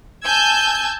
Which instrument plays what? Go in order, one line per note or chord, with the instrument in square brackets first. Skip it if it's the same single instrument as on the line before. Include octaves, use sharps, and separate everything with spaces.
[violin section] G#5 A5 E6 G6 G#6